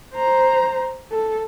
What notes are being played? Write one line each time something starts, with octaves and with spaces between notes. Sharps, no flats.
C5 A#5
A4